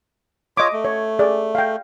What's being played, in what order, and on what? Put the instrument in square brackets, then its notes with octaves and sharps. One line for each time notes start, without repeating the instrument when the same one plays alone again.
[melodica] F4 C#5 [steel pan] D#5 D6
[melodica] A3
[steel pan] C#5
G#4 D5
F5 G5